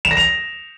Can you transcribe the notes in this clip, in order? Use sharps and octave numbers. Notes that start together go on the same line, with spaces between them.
E7
A#6
F7